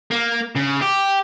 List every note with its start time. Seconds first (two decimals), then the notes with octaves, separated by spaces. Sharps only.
0.11 A#3
0.55 C#3
0.81 G4